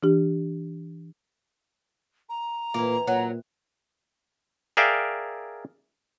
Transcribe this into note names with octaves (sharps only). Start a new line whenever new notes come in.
E3 D4 G4
A#5
A#2 E3 A#3 C4 E4
A#2 F#3
G#4 A#4 D5 E5 F5 G5